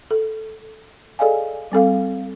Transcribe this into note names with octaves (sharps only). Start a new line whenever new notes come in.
A4
G#4 A4 D5 D#5 F5 G#5
G3 C4 A4 F5